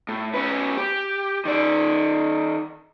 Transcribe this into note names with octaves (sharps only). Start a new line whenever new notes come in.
A2
C#4 B4
G4
D#3 D5